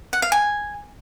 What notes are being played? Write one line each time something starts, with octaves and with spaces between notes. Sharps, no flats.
F#5
F5
G#5